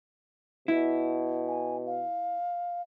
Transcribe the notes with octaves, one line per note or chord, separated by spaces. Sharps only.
B2 E4
G#5
F5